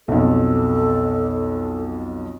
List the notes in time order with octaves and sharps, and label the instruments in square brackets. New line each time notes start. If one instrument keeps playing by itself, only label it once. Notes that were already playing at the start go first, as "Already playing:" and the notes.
[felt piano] B1 F2 [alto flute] A4